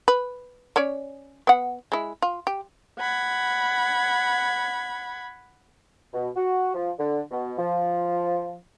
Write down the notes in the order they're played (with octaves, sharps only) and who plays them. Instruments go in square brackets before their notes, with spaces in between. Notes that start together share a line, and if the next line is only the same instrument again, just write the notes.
[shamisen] B4
C#4 C#5 D5
B3 F#5
G#3 E4
F4
G4
[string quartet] F#5 B5 G#6
[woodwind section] B2
F#4
F3
D3
B2
F3